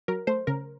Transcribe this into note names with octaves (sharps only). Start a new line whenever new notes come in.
F#3 A#4
A3 C5
C#3 A#4